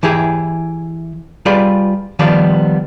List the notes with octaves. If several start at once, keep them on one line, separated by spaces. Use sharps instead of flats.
E3 E4 G4 G#4
G3 F4 G#4 B4 D5
D#3 F3 G3 B3 D5 F5